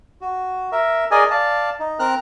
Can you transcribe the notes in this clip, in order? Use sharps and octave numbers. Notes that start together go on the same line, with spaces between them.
F#4
A#4 E5
G#4 A#4 D5 D#5 G#5
D5 F5 A5
D#4
C4 A#4 A#5 F6 F#6